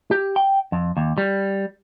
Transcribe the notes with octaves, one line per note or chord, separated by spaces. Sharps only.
G4
G5
F2
D#2
G3